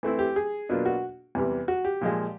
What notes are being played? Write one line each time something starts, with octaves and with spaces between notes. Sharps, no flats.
E3 A3 C4 E4
G4
G#4
B2 F#3 A#3 D4 F4
F#4
E2 C3 E3 G3
F#4
G4
A#2 F3 G#3